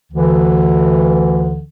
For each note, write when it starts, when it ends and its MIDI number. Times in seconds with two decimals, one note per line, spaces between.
0.12 1.61 38
0.12 1.61 50
0.12 1.61 52